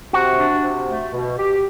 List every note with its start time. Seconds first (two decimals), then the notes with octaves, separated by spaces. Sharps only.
0.13 C3 F#4
0.38 D4
0.63 C3
0.88 A3
1.12 B2
1.37 G4